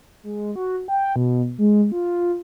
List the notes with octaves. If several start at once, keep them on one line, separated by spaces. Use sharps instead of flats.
G#3
F#4
G5
B2
G#3
F4